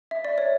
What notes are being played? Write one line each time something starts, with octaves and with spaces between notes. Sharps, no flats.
E5
D5
C#5